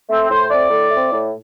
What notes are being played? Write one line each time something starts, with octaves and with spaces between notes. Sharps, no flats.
A3 C4
A2 C5
A3 C4 D5
A2
A3 C4
A2